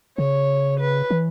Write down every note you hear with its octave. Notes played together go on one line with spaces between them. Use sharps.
C#3 C#5
B4
E3